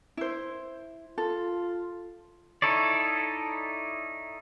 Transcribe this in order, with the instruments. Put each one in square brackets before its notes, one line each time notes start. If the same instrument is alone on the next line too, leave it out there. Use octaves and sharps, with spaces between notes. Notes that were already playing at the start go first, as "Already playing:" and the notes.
[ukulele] E4 C5
[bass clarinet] F4 [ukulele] A4
[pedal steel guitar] D#4 E4 A4 C#5 D5